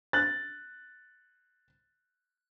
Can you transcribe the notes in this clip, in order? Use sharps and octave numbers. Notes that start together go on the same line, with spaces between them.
F#6 A6